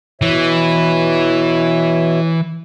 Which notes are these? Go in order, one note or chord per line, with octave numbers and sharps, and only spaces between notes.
B2 E3 C#5 E5